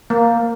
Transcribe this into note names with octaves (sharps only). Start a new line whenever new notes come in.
A#3